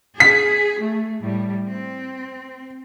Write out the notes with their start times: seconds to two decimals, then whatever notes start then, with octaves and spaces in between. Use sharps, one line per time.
0.20 G#4 B6
0.82 A3
1.21 A2 G3
1.69 C4